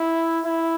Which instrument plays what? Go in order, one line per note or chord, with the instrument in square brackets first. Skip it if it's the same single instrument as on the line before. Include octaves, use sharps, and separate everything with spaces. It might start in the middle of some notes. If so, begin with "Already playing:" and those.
Already playing: [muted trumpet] E4
E4